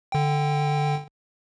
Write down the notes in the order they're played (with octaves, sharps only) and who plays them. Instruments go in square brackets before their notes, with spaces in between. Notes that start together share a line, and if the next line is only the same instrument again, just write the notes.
[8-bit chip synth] D3 G5